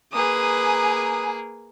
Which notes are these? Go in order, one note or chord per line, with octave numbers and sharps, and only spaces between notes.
A#3 G#4 B4 G#5 A#5 D#6